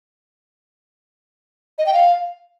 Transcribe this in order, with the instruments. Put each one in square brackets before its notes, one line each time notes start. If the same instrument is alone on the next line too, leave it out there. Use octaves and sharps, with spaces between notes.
[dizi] D#5
G5
F5